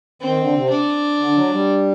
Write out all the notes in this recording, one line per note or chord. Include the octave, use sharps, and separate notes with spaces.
D#3 C4
D3
C3
D4
D3
F#3
G3